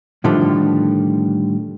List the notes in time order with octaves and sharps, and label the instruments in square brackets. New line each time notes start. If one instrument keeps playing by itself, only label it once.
[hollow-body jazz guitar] A2 D3 D#3 F3 G3